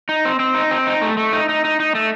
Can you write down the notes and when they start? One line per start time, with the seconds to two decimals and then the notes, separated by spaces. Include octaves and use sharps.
0.09 D#4
0.25 C4
0.40 C4
0.55 D#4
0.71 C4
0.87 D#4
1.02 A3
1.18 A3
1.33 D#4
1.49 D#4
1.65 D#4
1.80 D#4
1.95 A3